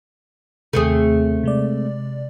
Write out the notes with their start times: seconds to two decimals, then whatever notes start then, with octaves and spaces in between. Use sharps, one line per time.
0.73 D#2 C3 A3 C4 G#4
1.43 C3 G#3 D5